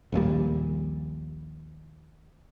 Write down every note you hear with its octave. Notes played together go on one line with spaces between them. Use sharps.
A#1 D#2 A#2 G3